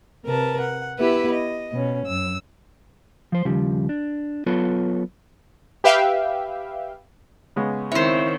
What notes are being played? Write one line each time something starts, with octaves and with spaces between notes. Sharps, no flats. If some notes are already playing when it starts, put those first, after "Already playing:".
C3 A#4 B4 A5
F#5
B3 E4 G4 B4 E5
D#5
B2 C#4
F#2 E6
F3 C5
D#2 C#3 F3 G3
D4
F#3 B3 F4 A4 B4 C#5
G4 B4 E5 F5 G5
C#3 G#3 B3
D#3 C4 E4 C5 C#5